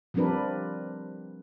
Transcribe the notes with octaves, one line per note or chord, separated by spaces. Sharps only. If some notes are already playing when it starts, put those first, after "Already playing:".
F3 G3 C4 D4 A#4 B4